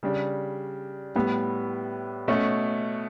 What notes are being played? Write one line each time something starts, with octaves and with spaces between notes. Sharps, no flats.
C#3 G3 D4
A2 G3 B3
B2 A3 C#4